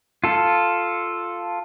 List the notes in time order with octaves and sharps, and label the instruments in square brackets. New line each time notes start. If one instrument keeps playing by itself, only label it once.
[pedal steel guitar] F4 A4